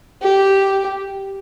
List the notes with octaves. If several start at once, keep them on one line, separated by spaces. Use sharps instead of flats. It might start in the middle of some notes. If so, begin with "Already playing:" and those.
G4